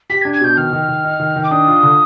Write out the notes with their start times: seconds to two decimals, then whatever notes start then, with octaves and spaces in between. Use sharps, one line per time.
0.10 G4 B6
0.22 G#6
0.25 D4
0.33 G#6
0.41 B2 G6
0.57 D#3 F6
0.73 D#3
0.88 D#3
1.04 D#4
1.20 D#3
1.36 D#3
1.44 D6
1.51 D4 D#6
1.67 F4
1.83 D3